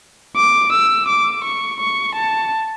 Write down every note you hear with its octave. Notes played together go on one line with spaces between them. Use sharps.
D6
E6
D6
C#6
C#6
A5